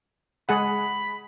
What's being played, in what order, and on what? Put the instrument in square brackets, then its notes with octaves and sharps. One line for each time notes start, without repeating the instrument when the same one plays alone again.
[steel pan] G#3 G#4 F#5 [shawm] B5